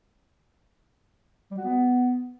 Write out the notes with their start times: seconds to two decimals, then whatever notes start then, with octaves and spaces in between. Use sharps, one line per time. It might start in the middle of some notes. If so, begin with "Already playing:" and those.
1.51 G3
1.58 F#4
1.64 B3